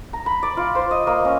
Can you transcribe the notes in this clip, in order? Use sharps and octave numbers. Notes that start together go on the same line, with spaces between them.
A#5
B5
D5
F4
C5
D#5
A#3
C#4